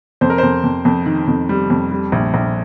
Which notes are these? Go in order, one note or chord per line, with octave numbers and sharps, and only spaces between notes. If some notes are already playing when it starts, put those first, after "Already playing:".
F2 C5
A#4
F2 C5
F2
F2
D#3
F2
G3
F2
G3
A#1
A#1